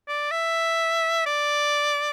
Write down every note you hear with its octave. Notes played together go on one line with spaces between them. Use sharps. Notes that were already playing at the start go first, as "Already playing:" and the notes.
D5
E5
D5